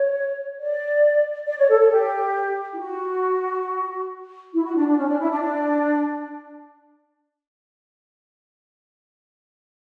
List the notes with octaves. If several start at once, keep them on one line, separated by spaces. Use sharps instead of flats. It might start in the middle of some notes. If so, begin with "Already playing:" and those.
Already playing: C#5
D5
D5
C#5
A4
A4
G4
E4
F#4
E4
F#4
D4
D4
C#4
D4
E4
D4
D4